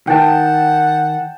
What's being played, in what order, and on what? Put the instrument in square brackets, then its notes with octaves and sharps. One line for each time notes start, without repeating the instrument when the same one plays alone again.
[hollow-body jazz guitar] D#3 [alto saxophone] F#5 [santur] G5 A5